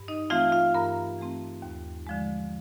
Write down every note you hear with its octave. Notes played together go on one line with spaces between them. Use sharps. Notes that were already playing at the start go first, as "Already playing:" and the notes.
Already playing: G2
D#4 D#5
E3 A3 C4 F4 F5
F4 F5
G2 A#4 A#5
E3 A3 C4
D#2
D3 F3 G#3